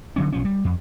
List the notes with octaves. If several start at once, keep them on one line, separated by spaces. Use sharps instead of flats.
D3 F#3 C#4
B1 F3 C#4
G3
F2